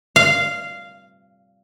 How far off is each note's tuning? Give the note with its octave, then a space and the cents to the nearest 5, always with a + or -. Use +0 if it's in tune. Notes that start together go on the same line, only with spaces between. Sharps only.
F5 -10